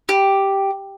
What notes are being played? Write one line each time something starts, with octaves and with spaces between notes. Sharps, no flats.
G4